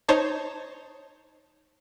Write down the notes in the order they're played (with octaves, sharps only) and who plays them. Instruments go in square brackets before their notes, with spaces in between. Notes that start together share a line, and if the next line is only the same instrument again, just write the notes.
[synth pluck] D#4 C5 C#5 A5